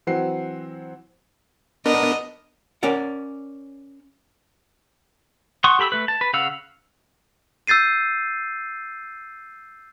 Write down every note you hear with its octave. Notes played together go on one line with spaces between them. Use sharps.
E3 F#3 C4 F#5 C7
B3 D4 A#4 D#5
C#4 A#4 C#5 D5 F#5
F#5 C6 C#6 D#6
G4 A4 B5 C#6 E6
A3 B4
A5
B4
C#3 F5 F#5 E6
E6 G6 A6 C7 D#7